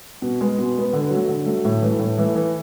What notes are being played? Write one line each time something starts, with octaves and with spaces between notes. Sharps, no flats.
B2
G#3 B3
B2
G#3 B3
D3
F#3 A3
D3
F#3 A3
A2
E3 A3
A2
E3 A3
E3